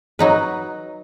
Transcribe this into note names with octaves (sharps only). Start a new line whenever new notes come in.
F#3 D#4 B4